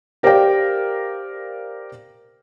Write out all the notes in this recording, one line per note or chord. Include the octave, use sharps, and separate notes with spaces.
G4 A#4 C5 D5 F5 G5